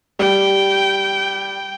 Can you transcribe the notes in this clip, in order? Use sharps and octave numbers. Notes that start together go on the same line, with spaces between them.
G3 G5